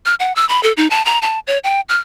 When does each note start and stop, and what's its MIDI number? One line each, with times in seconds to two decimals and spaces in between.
0.06 0.15 89
0.20 0.33 78
0.36 0.47 88
0.49 0.62 83
0.63 0.72 69
0.77 0.87 63
0.90 1.04 81
1.05 1.19 82
1.22 1.39 81
1.47 1.58 73
1.64 1.81 79
1.89 1.98 89